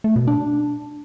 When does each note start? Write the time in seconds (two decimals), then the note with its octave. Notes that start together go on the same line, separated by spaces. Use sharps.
0.04 A3
0.16 B2
0.27 D4